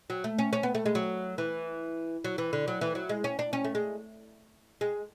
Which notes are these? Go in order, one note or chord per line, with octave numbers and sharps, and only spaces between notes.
F#3
A3
C#4
C#4
B3
A3
G#3
F#3
E3
F#3
E3
D3
F#3
E3
F#3
G#3
C#4
D4
C#4
A3
G#3
G#3